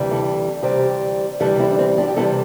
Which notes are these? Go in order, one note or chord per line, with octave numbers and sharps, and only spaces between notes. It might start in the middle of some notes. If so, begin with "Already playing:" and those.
Already playing: D2 C3 E3 G3
E4 A4
D2 C3 E3 G3 G4 C5
D2 C3 E3 G3 E4 A4
C4 E4
D4
C4 E4
D4 G4
G4
C3 E3 G3 E4 A4